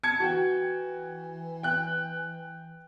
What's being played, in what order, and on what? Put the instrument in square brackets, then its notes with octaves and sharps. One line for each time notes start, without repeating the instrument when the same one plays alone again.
[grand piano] A5 G#6 C#7
[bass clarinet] E3 [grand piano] F#4 G5
[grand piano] G5 F#6